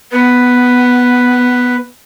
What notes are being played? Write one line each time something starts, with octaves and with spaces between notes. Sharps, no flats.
B3 B4